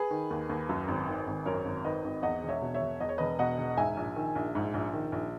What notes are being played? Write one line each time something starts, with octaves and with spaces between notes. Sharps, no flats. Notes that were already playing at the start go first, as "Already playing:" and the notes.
Already playing: G#4 B4
D#3
D#2
D#2
F#2
G#1
D#3
G#1
F#2 A#4 C#5
G#1
D#3 B4 D#5
G#1
E2 D#5 F#5
E1
C#5 E5
B2
C#5 E5
E1
E2 D#5
C#5
E1 B4 D#5
B2 D#5 F#5
E1
G#2 E5 G#5
A#1
D#3
A#1
G#2
A#1
D#3
A#1